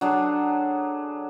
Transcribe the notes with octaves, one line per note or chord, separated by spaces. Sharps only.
F#3 D4 G#4 A4